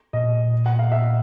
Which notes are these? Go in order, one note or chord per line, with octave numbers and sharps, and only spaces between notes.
A#2 D#5
F#5
F5
E5